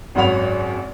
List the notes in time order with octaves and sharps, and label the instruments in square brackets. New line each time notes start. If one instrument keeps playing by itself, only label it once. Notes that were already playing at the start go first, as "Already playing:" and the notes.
[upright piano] G#1 F#2 C#4 F#5 B5 F7